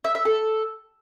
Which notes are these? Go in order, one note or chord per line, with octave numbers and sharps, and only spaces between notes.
E5
E5
A4